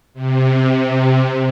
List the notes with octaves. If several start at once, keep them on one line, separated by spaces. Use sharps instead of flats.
C3